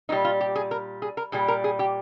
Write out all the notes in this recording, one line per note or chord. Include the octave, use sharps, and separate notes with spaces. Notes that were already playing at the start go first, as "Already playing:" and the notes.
A#2 G3 D#4
F4
G4
G#4
A#4
G#4
A#4
A#2 G3 G#4
A#4
G#4
G4